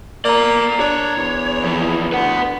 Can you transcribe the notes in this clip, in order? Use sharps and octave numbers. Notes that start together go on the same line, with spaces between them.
A#3 D5 A#5
D4 C#5
E2
F2 E3
D2 B4 F#5